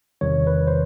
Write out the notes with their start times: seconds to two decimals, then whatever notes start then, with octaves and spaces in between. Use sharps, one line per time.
0.21 E2 C3 D#3 G3 C#5
0.47 B4
0.67 C5